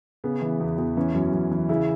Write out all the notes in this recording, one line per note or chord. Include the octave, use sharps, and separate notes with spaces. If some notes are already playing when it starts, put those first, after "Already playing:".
C#3 B3
E3
E2
E2
E3 C#4
F#2
F#2
E3
C#3 E4